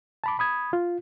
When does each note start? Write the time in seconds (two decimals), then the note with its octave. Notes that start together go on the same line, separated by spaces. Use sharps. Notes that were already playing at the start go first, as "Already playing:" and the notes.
0.24 A5 B5 D6
0.39 B5 D#6 G#6
0.73 F4